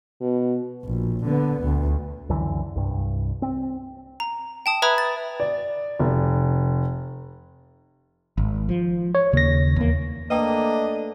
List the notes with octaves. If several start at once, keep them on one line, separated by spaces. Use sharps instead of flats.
B2
A#1
D3 B3
D2
C#2 F#2 D3 E3
C2 G2
C4
A#5
G5 A5 D#6
B4 E5 A#5 B5 D#6 G#6
A6
D5
F1
G#1
F3
C#5
D#2 C#3 A#6
E2 A#3
A3 A#3 D4 B4 D#5 G5 D#6